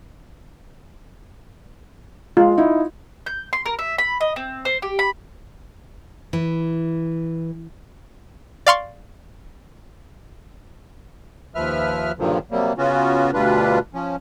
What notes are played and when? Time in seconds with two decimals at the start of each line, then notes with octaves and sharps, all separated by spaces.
2.37 G#3 F4
2.58 D#4 E4
3.26 G6
3.53 C6
3.66 A#4
3.79 E5
3.98 B5
4.21 D#5
4.36 C4
4.65 C5
4.82 G4
4.99 B5
6.33 E3
8.66 D5 F5 C6 C#6
11.55 D#2 F3 B4 E5 F6
12.19 G2 A#2 D3 D#3 F3 F#3
12.51 C3 F#3 G3 A#3
12.78 C#3 B3 C#4 F4 F#4
13.34 D2 B2 G3 D4 F4 B4
13.94 F3 C#4